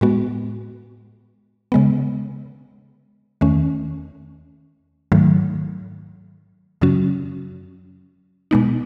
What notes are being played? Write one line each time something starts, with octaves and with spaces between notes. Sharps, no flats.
A2 G#3 B3 F#4
C#3 G#3 B3
E2 D#3 A3 C#4
G#2 D#3 F#3 A3
F#2 C#3 F#3 C#4 F#4
B2 G#3 B3 D#4